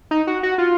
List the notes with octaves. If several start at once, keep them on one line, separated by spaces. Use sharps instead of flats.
D#4
F#4
F#4
F4